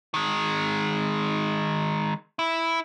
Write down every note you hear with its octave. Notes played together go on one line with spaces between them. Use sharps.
D#3 G#3
E4